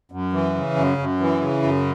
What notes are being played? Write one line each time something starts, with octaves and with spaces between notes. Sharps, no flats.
F#2
E3
C#3
F#2
F#2
E3
C#3
F#2